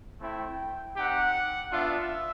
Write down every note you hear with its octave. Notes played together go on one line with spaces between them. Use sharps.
A3 C4 E4 G5
C4 D#4 G4 F#5
B3 D4 F4 E5